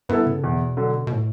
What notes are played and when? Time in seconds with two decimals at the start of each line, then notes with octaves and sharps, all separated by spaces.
0.09 G2 B3 E4 A4
0.26 C#3
0.43 E2 B2
0.77 D3 F#3
1.07 B2
1.12 A2